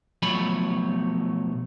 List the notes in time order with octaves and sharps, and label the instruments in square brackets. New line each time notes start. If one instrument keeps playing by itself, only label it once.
[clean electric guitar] B1 F3 F#3 A3 C#5 B5